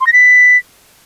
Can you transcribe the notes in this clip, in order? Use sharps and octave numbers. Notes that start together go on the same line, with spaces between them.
C6
A#6
B6